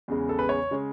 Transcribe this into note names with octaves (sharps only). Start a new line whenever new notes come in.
E2 C#3 G#3
A4
B4
C#5
C#3 G#3